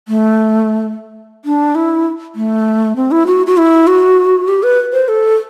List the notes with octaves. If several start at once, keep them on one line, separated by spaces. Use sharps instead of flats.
A3
D4
E4
A3
C4
E4
F#4
F#4
E4
F#4
G4
B4
C5
A4